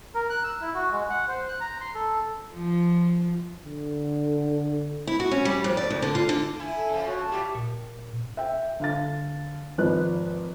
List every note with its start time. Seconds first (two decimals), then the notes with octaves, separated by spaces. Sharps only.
0.15 A#4
0.30 F#6
0.44 E6
0.61 E4
0.74 F#4
0.91 G#3
1.10 F#5
1.28 C5
1.48 F#6
1.60 A#5
1.81 C6
1.95 A4
2.54 F3
3.64 D3
5.07 E4
5.20 F#4
5.31 C#4
5.45 G3
5.64 F2
5.77 D5
5.90 D2
6.02 D3
6.15 F4
6.29 D3
6.60 E4 G#5
6.75 A4
6.89 C#3 F3
7.05 F#4 C#5
7.19 A5
7.31 G3 E4 F4 G4
7.55 A#2
8.37 E5 G5
8.80 D3 F5 A6
9.78 G#1 F3 D#4 B4 F#6